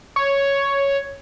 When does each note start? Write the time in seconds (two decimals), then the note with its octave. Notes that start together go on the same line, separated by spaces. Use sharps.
0.16 C#5